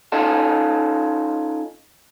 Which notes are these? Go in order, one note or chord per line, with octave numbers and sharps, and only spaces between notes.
C#4 D#4 F4 A4